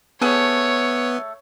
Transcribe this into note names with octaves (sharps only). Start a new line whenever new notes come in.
A3 B3 G#4 C#5